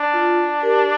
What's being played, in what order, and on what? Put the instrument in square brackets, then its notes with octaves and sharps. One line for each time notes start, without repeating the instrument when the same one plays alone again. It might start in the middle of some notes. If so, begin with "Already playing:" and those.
Already playing: [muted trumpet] D4
[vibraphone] F4
G4 A#4